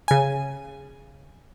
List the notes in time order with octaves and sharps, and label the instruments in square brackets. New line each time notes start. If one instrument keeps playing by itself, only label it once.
[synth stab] C#3 G#5